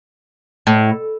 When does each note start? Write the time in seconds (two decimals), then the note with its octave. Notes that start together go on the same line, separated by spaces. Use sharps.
0.67 A2